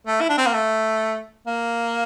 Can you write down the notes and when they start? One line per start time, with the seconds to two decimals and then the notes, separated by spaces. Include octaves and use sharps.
0.07 A3
0.21 E4
0.29 D4
0.38 C4
0.47 A#3
0.54 A3
1.47 A#3